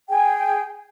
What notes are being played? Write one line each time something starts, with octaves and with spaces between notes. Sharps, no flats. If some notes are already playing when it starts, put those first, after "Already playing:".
G#4 G5 G#5